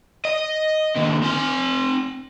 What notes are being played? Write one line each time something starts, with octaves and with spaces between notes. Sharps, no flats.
D#5
D#2 D3
C4 G#5